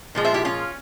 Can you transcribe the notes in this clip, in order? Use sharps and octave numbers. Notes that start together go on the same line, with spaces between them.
A#2 F3 G#3
C5 E5
E4 G4
C#4 F4